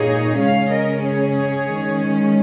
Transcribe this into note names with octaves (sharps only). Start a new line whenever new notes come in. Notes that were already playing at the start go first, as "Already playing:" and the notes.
Already playing: A#2 A#3 D#4 G#4 C#5
C#3 G#3 C#4 C#5 F5
A#4 D#5
G#4 C#5
D#3 G#3 C#4